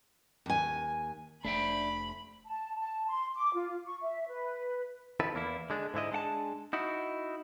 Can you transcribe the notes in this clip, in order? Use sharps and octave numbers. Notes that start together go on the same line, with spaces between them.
D#2 G#5
F1 A3 D4 E5 G5 B5
A5
A5
C6
D6
F4
C#6
E5
B4
F2 D#3 E4 A4 B4
E2 A#3 E4
D3 G#3 D4
G#2 D3 E4 D#5
G#3 D4 F#5 A5
D#4 E4 F#4